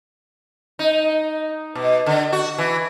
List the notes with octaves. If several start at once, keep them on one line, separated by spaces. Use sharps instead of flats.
D#4
B2
D3
F#4
E3